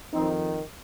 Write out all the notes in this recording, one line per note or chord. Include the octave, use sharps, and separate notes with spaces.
F2 D#3 C4 D#4